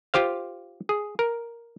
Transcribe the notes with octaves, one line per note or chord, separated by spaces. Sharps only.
F4 G4 C5 F5
G#4
A#4